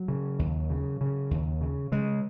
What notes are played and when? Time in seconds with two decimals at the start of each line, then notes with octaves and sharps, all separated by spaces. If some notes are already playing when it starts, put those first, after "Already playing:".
Already playing: F#3
0.08 C#3
0.39 D#2
0.70 C#3
1.01 C#3
1.31 D#2
1.61 C#3
1.92 C#3 G#3